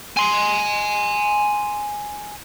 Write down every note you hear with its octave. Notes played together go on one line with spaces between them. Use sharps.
G#5 C6